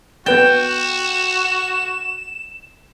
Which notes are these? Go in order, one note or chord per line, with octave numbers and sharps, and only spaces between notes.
B3 F#4 B4 G5 A6 E7